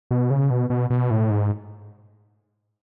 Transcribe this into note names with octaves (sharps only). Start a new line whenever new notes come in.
B2
C#3
B2
B2
B2
A2
G#2